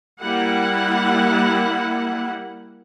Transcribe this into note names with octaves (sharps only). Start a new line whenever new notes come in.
G3 A#3 E4 F#5